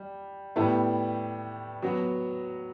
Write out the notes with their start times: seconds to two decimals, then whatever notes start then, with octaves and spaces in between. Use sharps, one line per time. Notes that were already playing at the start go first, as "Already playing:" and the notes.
Already playing: G3
0.56 A2 G3 B3 E4
1.83 F#3 B3 F#4